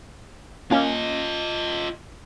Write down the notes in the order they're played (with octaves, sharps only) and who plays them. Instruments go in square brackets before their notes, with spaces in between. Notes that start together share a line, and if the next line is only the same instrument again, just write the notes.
[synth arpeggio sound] A#3 C#4 [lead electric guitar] F4 D#5